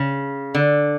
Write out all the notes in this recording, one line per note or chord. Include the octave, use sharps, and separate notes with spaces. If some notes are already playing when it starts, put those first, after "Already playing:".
Already playing: C#3
D3